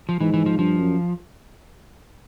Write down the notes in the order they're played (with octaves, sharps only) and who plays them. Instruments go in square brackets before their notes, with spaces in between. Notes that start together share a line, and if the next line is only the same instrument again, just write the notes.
[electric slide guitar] F3
[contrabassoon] G#2 [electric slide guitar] E3
[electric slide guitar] E3
F3
[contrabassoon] G2 [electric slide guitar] F3
[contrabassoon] F#2